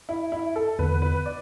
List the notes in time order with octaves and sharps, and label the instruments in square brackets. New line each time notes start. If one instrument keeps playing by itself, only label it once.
[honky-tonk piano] E4
E4
A4
[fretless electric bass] E2 D3 B3 [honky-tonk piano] B4
[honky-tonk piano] B4
D5